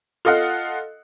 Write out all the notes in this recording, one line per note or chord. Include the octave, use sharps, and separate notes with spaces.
F4 A4 D#5 F5 F#5